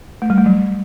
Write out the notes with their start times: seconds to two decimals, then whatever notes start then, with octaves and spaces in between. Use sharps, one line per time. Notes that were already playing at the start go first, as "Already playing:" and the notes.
0.22 A3
0.30 G3
0.38 A3
0.46 F#3